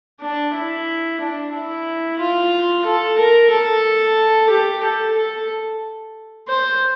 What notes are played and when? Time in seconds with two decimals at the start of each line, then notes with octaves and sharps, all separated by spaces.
0.21 D4
0.55 E4
1.21 D4
1.53 E4
2.19 F4
2.86 A4
3.19 A#4
3.51 A4
4.50 G4
4.83 A4
5.16 A4
6.48 C5